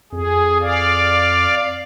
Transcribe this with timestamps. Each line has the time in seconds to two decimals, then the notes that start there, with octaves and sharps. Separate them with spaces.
0.12 F2 G#4
0.61 D5 F5